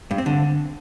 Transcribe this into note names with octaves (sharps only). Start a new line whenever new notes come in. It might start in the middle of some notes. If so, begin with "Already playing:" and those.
G2
C4
D3